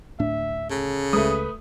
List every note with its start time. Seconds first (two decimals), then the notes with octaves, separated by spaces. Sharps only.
0.19 D1 A2 D4 E5
0.70 C#3 A4
1.13 C#2 G#3 A3 B4 D#6